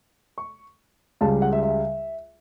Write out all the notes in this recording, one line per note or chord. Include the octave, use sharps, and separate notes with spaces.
C#6
C#2 C#3 G3 A5
F#5
E5
E5